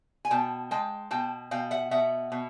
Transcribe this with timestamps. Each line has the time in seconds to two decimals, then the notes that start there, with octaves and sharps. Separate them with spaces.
0.25 G#5
0.31 B2 G5 A5
0.71 G#3 G5 A5
1.11 B2 G5 A5
1.51 B2 F5 G5
1.71 E5 F#5
1.91 B2 E5 F#5
2.32 B2